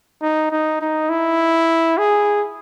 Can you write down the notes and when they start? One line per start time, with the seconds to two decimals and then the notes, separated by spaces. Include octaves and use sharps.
0.22 D#4
0.51 D#4
0.81 D#4
1.09 E4
1.98 G#4